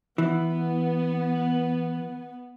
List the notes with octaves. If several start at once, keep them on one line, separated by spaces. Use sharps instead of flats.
E3 B3